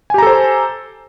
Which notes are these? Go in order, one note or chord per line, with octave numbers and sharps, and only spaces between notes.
G4 A4 C5 G#5 A#5